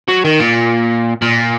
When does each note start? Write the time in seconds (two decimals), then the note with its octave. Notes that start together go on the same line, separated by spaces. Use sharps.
0.08 F#3
0.25 D#3
0.40 A#2
1.22 A#2